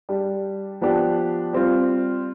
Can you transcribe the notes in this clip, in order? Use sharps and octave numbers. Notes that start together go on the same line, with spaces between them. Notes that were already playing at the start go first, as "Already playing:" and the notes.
G3 D4 G4
F3 B3 D4 G4
G3 C4 F4